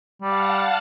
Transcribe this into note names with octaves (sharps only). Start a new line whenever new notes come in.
G3 F5 F#5 A5